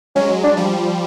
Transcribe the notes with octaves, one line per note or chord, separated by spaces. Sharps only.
F#3 G#3 C#4
D4
F3 G3